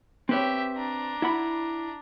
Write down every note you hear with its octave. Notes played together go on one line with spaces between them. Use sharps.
C4 G4 B4 C#5 E5
D4 A#5
E4 F#5 B5